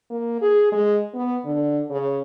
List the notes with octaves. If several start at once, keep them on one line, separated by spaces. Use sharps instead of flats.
A#3
G#4
G#3
B3
D3
C#3